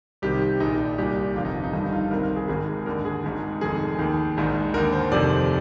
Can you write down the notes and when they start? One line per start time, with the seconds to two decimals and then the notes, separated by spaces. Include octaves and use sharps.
0.22 C2 C3 D#3 G4
0.42 G4
0.60 A#1 A#2 D#4
0.98 C2 A#2 G4
1.35 G1 F2 C3 D#3 F4
1.45 D#4
1.55 F4
1.64 D#4
1.73 G1 G2 D#3
1.84 D#4
1.93 F4
2.11 C2 C3 D#3 A#4
2.23 A#4
2.36 G#4
2.48 G#1 G#2 D#3 G#4
2.86 D#2 D3 A#4
3.05 G#4
3.24 G#1 G#2 D#3
3.61 F1 F2 D#3 G#4
3.99 D#2 D#3
4.37 A#1 G#2 D#3
4.74 D#2 D3 A#4
4.92 C5
5.12 F1 F2 C3 D#3 D5